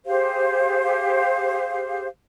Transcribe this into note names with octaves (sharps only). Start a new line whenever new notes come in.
G4 G#4 C5 F5